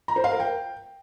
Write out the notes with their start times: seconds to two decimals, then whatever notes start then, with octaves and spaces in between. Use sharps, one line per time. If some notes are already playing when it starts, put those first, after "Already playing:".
0.08 A#5
0.16 C5
0.24 F5
0.32 A#4
0.40 G5